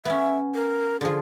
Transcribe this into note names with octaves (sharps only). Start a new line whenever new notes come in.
B3 C#4 E5
A#4
D3 F3 G#4